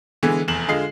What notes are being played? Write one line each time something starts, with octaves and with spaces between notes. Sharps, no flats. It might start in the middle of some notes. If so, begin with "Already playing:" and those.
D3 E3 G#3 B3
F1 E2 E7 F#7
D3 G#3 F4 D#5 C7